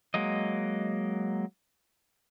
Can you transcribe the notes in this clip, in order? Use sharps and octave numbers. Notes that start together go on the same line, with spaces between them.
F#3 G#3 A#3 D#5